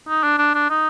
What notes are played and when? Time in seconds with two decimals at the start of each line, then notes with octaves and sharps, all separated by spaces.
0.08 D#4
0.23 D4
0.38 D4
0.54 D4
0.70 D#4